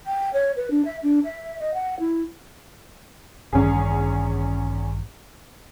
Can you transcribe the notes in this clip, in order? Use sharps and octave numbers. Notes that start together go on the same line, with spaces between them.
G5
C#5
B4
D4
E5
D4
E5
D#5
F#5
E4
A1 E2 G2 D#3 C#4 G#4